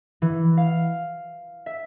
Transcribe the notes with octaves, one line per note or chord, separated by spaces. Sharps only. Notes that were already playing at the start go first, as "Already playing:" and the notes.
E3
F5
E5